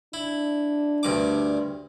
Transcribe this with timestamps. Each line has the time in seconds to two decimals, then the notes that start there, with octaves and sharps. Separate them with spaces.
0.14 D4 E4
1.03 D2 G2 D6